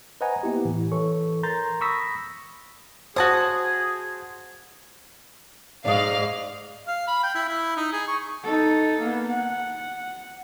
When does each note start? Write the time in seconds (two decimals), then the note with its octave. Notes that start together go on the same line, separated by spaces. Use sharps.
0.21 B4 C5 D#5 F#5 G#5 A#5
0.43 A#3 B3 E4 G4
0.65 A2 E3
0.91 E3 E4 A4 C#5 C#6
1.43 A#4 A#5 C6 G6 A6
1.81 B5 C#6 D#6 E6 A#6 B6
3.16 F#4 G#4 C5 A5 D#6
5.85 G#2 D5 D#5 F5
6.88 F5
7.07 B5
7.23 G5
7.35 E4
7.49 E4
7.77 D#4
7.93 G#4
8.08 C#6
8.43 D#4 A4
9.00 A#3 B3
9.29 F#5